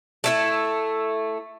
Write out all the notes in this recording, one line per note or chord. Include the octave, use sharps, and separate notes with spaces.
A3 E4 E5